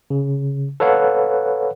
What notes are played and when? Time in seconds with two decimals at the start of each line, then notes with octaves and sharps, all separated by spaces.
0.10 C#3
0.80 A4 B4 C#5 F5 F#5